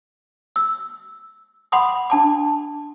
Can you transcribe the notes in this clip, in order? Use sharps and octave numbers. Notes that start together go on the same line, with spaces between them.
E6
F#5 B5 C6 D6 D#6
D4 A5 D6